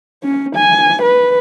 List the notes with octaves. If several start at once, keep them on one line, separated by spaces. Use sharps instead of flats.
C#4
G#5
B4